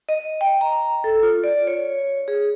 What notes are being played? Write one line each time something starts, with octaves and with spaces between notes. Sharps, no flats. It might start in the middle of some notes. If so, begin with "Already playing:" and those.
D#5
G5
A#5
A4
F4
D5
C#5
G#4